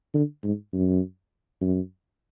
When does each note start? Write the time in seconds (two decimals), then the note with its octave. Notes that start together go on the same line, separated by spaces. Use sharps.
0.14 D3
0.44 G#2
0.73 F#2
1.61 F#2